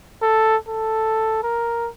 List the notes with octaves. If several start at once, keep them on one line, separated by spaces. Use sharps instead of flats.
A4
A4
A#4